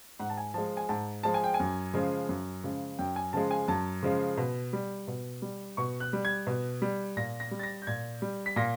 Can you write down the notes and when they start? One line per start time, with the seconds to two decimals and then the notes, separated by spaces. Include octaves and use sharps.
0.19 G#2 F#5
0.30 A5
0.37 G#5
0.54 F3 G#3 A5
0.77 G#5
0.89 G#2 A5
1.23 F3 G#3 A5
1.34 G#5
1.44 G5
1.54 G#5
1.60 F#2
1.94 C#3 F3 G#3
2.29 F#2
2.64 C#3 F3 G#3
2.99 F#2 G5
3.16 G#5
3.33 C#3 F3 G#3 A5
3.51 G#5
3.68 F#2 A5
4.03 C#3 F3 G#3
4.37 B2
4.73 G3
5.08 B2
5.42 G3
5.77 B2 C#6
6.00 F#6
6.13 G3
6.25 G#6
6.47 B2
6.82 G3
7.17 A#2 A#6
7.40 A#6
7.51 G3
7.59 A6
7.63 A#6
7.82 G6
7.87 A#2 G#6
8.22 G3
8.46 B6
8.56 A#2 A#6